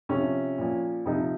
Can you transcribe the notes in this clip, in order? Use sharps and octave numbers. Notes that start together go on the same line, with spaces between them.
C3 F3 C#4
A#2 F3
C3 F3 D#4